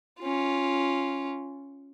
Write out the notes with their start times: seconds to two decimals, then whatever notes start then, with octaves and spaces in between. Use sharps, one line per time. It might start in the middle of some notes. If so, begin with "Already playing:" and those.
0.21 C#4 F4